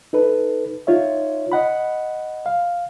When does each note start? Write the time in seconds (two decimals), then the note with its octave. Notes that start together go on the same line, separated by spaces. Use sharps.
0.13 D#4 A4 B4
0.87 D#4 F4 C#5 E5
1.52 D#5 F#5 B5
2.46 F5